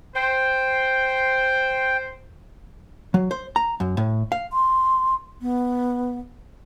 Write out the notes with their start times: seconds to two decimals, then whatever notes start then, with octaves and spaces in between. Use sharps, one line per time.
0.16 C5 G5
3.14 F#3
3.31 C5
3.56 A#5
3.80 F#2
3.97 A2
4.32 F5
4.51 C6
5.42 B3